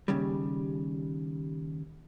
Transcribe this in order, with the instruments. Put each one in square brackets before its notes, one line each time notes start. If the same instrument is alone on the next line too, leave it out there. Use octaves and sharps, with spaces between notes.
[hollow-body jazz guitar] D#2 C#3 G3